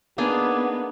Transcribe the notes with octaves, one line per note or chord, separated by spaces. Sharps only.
A#3 B3 D4 D#4 G#4